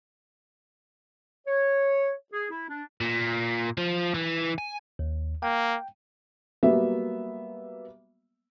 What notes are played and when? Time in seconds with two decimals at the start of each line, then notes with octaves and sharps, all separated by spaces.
1.47 C#5
2.33 G#4
2.50 E4
2.69 D4
3.01 A#2
3.78 F3
4.14 E3
4.58 G#5
4.99 D#2
5.43 A#3 G5
6.63 F#3 G3 A#3 B3 E5